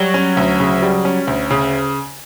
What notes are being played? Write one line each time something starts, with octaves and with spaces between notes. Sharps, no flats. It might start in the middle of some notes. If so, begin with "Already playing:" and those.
Already playing: F#3 G3
C#4
D2
C#3
G3
C#4
D2
C#3